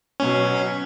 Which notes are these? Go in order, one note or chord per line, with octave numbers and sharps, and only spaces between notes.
B2 F#3 C#4